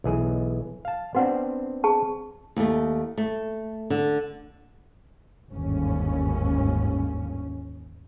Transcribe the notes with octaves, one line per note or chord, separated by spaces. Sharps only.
B1 E3 G#4
F5 A5
B3 C4 D4 F#4 F#5
G#4 A5 C#6
D#2 A3
A3
D3
G1 D#2 G#2 C#4